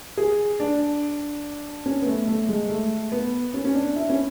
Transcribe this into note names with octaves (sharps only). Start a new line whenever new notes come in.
G#4
D4
C#4
B3
A3
A3
G#3
A3
B3
C#4
C#4
D4
E4
C#4